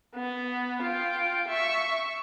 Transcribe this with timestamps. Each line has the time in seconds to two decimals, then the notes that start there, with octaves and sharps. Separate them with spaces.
0.16 B3
0.83 F4 G5
1.49 E5 C#6